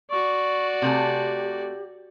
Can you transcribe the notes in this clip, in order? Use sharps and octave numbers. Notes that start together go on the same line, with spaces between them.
F#4 D5 C#6
C3 A3 G4 G#5